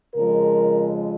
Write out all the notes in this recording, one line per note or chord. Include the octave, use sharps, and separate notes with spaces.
F2 C#3 F3 G#3 A#4